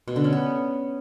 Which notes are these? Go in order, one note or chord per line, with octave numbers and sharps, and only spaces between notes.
B2
D3
C#4
B3